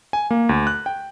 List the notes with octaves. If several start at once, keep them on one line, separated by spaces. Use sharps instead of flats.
G#5
A#3
D2
F#6
G5